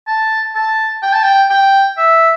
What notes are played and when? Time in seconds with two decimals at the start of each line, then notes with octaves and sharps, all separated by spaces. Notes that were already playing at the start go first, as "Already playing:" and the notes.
0.07 A5
0.55 A5
1.02 G5
1.13 A5
1.23 G5
1.50 G5
1.98 E5